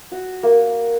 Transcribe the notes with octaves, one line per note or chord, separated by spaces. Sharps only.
F#4
A#3